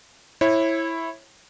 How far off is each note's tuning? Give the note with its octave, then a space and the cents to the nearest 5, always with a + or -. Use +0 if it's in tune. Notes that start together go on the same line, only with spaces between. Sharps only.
E4 +0 C#5 -30